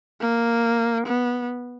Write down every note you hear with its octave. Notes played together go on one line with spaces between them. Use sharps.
A#3
B3